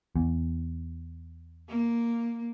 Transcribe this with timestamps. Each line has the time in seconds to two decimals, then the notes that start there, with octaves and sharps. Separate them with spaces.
0.16 E2
1.68 A#3